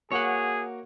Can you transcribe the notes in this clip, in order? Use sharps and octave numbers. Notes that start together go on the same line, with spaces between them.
A#3 F#4 G#4 C#5 F#5